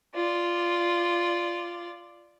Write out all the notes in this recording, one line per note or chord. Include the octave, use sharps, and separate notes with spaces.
F4 D5